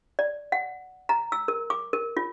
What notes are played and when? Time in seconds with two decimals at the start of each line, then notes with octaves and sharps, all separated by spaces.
0.19 D5
0.52 F#5
1.09 A#5
1.32 E6
1.48 A#4
1.70 D6
1.93 A#4
2.17 F4